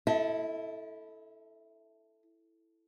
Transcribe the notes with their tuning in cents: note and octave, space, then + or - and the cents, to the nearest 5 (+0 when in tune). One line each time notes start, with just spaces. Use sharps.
E4 +0 A4 +0 D#5 +45